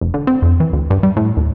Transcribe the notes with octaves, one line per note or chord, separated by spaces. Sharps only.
F1
D3
C4
F2
E3
D2
G2
G3
A2
D#2